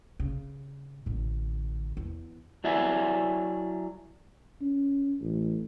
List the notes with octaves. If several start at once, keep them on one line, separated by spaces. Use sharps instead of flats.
C#3
A1 D3
E2
F#3 E4 D5 E5 G#5
C#4
A1